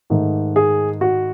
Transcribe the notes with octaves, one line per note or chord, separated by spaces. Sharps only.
G#2 D#3 A3
G#4
F#4